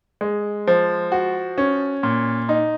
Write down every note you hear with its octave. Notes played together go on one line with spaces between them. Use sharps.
G#3
F3
F#4
C#4
A#2
D#4